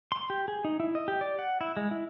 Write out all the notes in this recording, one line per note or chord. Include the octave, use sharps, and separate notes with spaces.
C6
G4
G#4
D#4
E4
D#5
G4
D5
F#5
E4
G#3
E4